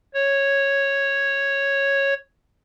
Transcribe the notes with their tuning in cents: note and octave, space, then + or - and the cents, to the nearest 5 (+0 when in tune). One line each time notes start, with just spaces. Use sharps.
C#5 -5